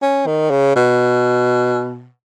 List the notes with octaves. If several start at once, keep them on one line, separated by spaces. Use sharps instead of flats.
C#4
D#3
C#3
B2